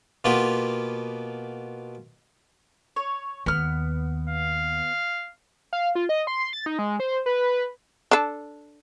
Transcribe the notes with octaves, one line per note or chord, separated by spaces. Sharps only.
B2 A#3 B3 F4 G4 B4
C#5
D#2 B3 F6
F5
F5
F4
D#5
C6
A6
D#4
G#3
C5
B4
D4 A4